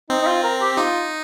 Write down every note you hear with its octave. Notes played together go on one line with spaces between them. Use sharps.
C4 D#4
D#4
F4
A#4
G4
D#4 F4